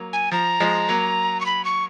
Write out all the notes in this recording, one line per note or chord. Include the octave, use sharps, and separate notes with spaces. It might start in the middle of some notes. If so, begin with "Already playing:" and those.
Already playing: F#3 A#3
G#5
F3 A#5
F3 G#3
F#3 A#3
C#6
B5
C#6